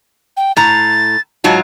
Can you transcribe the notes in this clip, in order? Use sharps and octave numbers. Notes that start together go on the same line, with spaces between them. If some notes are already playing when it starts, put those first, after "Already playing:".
G5
A2 A#5 A6
G#2 F#3 F4 A5